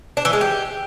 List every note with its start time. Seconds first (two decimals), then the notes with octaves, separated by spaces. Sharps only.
0.17 D4
0.25 E3
0.33 G#3
0.41 G4